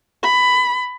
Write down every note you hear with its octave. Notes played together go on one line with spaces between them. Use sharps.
B5